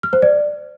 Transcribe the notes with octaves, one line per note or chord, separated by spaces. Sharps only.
F6
C5
D5